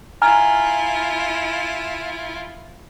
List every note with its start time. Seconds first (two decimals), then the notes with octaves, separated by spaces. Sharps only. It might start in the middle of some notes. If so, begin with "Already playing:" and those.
0.22 E4 F4 G#5 A#5 F6